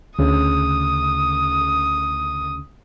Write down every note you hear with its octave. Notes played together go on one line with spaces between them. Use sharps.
D2 C#3 D#6